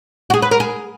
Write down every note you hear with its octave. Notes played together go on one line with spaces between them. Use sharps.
F#4
G#4
B4
A#4
G#4